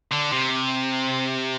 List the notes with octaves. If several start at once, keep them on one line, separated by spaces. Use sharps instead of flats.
D3
C3